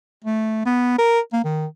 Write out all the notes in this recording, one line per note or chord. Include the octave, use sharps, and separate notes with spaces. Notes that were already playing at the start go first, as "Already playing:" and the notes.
A3
B3
A#4
A#3
D#3